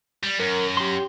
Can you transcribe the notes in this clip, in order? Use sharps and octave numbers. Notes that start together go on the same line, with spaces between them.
G3
F#2 A#4
G4 C6